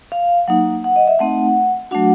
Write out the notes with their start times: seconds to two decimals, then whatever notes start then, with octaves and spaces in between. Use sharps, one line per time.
0.12 F5
0.48 F#3 A#3 D#4 F#5
0.84 F#5
0.96 D#5
1.07 E5
1.19 A3 C4 D#4 F#5
1.91 F#3 A3 D4 F#4 F#5